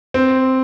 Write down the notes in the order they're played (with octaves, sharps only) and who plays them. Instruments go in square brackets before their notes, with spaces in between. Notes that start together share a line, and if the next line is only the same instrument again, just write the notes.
[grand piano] C4